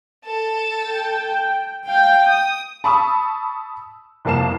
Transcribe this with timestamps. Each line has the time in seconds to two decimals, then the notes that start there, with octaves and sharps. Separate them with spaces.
0.25 A4 A5
0.83 G5
1.87 F5 G5
2.27 D#6
2.84 A5 B5 C#6 D#6 E6
4.25 C2 F2 A#3 A5 C7 E7